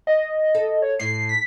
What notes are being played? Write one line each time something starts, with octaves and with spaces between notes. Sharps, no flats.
D#5
A4
C#5
A2 E4 C7
B6